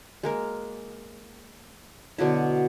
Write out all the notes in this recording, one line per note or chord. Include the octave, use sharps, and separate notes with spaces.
G#3 A#3 A#4
B2 D3 F#3 E4